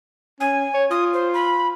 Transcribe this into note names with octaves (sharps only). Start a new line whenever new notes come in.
C#4 G#5
C#5
F4 D#6
C5
B5